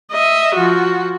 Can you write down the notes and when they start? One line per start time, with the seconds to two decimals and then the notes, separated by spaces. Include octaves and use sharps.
0.12 D#5 E5
0.55 F3 F#4